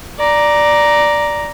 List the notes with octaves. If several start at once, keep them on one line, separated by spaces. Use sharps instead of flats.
D5 A#5